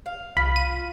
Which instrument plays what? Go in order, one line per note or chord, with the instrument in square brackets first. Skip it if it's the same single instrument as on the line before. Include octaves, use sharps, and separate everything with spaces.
[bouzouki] F5
[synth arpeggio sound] C2 [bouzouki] F4 [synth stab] B5
[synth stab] D#7